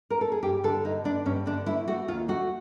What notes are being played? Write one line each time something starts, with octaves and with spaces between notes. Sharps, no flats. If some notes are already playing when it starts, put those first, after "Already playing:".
A#4
A4
G#4
G2 G4
D3 A4
G2 D#4
D3 D4
G2 C#4
D3 D4
A3 E4
A3 F#4
D#2 F4
A3 F#4